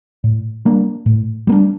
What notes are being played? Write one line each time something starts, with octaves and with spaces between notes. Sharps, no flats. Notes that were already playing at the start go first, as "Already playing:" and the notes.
A2
G3 A#3 D4
A2
G3 A#3
D4